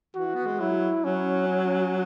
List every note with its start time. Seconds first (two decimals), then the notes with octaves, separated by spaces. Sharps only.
0.16 E3 F#4
0.34 B3
0.46 G#3
0.60 F#3 E4
1.04 F#3 C#4
1.48 C#4